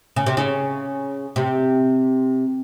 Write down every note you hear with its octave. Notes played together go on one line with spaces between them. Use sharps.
C#3
C3
C#3
C3